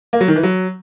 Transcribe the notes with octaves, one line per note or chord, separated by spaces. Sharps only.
A#3
F#3
D#3
E3
F#3